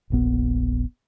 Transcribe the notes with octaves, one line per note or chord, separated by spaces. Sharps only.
E1 A#1 B3